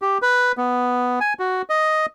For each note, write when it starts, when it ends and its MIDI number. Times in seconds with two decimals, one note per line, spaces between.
0.02 0.18 67
0.22 0.52 71
0.57 1.19 59
1.21 1.34 80
1.39 1.62 66
1.70 2.06 75